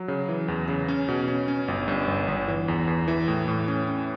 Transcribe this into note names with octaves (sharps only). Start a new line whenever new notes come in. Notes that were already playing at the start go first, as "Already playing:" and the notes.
Already playing: F#3
C#3
E3
E2
C#3
C#4
B2
C#4
C#4
G1
G2
G1
G1
E3
E2
E2
E3
A2
A2
C#4
C#4